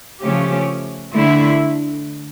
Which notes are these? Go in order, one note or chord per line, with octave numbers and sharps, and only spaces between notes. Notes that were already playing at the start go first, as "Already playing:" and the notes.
C#3 F3 A3 C#4 G4
D3 A3 E4